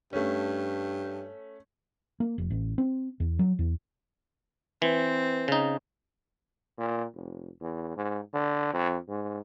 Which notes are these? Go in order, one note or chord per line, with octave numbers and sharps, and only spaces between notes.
G2 A3 C#4
A#3
F1
A1
C4
E2
F#3
E2
E3 C4
C#3 D#4
A#2
F1
E2
G#2
D3
F2
G#2